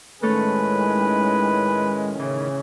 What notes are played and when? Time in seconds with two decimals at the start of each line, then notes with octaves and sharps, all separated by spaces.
0.22 A2 D#3 G#3 A3 C#4 A4 B4 C#5
2.19 C#3 E3